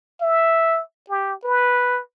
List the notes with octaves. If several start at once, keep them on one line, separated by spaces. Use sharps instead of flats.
E5
G4
B4